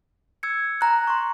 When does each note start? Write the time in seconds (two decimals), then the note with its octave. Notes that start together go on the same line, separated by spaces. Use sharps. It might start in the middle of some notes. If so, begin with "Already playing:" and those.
0.43 E6 G#6 C#7
0.81 G#5 A#5 F#6
1.07 C6 C#6